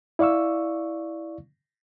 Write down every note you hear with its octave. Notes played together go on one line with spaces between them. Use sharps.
E4 D5 F5 C#6 E6